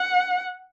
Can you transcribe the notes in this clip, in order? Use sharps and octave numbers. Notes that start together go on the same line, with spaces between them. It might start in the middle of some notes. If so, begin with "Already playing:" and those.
Already playing: F#5